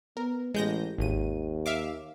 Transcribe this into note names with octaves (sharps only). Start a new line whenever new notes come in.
B3 A#4
A1 G#3 G6 A#6
G#1 D#2 D#7
E5 F5 D6